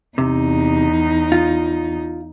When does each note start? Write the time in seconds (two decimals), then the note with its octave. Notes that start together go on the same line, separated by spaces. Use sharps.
0.18 E2 C3 D#4
1.32 F4